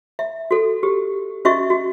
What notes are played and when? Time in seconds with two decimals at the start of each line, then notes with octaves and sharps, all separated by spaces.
0.19 E5
0.51 F#4 A4
0.83 G4
1.45 C#4 F#4 D#5 E5 C#6
1.70 F#4